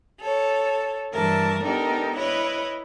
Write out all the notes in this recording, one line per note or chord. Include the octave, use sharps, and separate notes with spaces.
A4 C#5
G2 E3 A#4 E5 A5
B3 D4 D#4 G4 A4 A#4
E4 B4 C#5 D#5